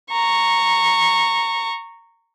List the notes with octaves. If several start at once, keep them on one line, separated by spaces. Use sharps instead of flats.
A#5 C#6